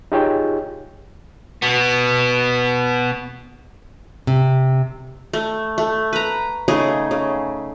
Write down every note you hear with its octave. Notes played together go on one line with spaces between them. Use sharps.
D#4 F4 G4 G#4 C#5 G5
B2 B3
C3
A3
A3
B4 A#5
C#3 A3 D#4 G#4
C#3